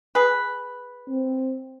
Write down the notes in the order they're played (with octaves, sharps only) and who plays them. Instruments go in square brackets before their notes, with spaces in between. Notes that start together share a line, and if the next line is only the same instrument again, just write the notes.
[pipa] G#4 B4
[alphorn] C4